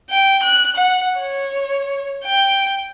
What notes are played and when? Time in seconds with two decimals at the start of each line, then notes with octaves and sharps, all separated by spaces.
0.10 G5
0.43 F#6
0.76 F#5
1.18 C#5
2.25 G5